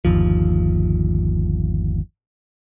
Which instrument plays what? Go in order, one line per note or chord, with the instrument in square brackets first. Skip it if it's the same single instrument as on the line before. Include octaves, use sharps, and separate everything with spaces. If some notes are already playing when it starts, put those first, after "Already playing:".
[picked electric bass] G1 D#2 F3